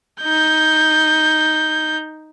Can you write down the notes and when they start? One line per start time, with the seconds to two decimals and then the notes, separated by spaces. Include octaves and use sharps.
0.23 D#4 G6